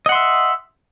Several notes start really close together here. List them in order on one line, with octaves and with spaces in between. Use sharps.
D#5 F#5 C6 E5